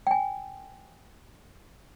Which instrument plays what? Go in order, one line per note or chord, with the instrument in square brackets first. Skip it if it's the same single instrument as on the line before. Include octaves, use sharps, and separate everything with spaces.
[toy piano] G5 G#5